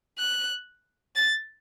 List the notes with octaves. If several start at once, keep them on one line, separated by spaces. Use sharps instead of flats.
F#6
A6